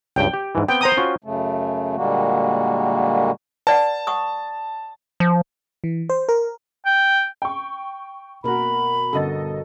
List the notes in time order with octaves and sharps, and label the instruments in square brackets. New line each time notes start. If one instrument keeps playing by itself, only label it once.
[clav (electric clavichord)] C#2 G2 [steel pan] G5
[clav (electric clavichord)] G4
G#2 E3
[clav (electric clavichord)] B3 C4 [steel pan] G5
[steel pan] C5 A#5 D#6
[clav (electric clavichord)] C#4 F4 F#4
[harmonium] F#2 C#3 A3
A#2 D3 G3 G#3 A#3 F#4
[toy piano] B4 D5 F#5 [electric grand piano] A5
[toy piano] F#5 C#6 D#6
[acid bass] F3
[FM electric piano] E3
C5
A#4
[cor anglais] G5
[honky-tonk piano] G5 C#6
[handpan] B2 A#4 [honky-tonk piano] A#3 F#4 [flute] B5
[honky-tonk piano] G1 D#5 A6 [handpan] D3 F#4 A4